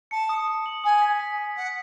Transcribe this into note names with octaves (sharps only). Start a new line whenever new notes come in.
A5 C#7
D#6
D#6
F#7
G#5 D#6
B6
B6
D#6
F#5 B6